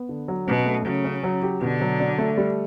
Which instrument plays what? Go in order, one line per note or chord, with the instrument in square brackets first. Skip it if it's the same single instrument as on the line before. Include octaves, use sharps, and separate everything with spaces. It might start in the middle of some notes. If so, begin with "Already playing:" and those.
Already playing: [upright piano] B3
D3
F#3
[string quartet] B2 [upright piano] C#4
[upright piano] A3
[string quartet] C#3 [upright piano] F#3
[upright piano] C#4
F#3
G4
[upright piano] B2 [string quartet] D3
[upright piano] F#3
D4
A3
G3